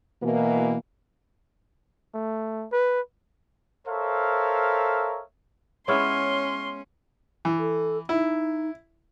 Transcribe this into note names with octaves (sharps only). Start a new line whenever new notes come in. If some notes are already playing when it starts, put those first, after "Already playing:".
B2 E3 A#3
A3
B4
A4 A#4 C5 C#5 E5 F5
G#3 B3 C#4 E4 C#5 C6 C#6 F6
E3
A4
D#4 E4